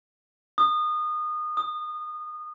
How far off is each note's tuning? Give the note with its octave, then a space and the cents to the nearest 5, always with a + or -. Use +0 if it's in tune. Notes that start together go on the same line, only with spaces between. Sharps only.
D#6 -25
D#6 -5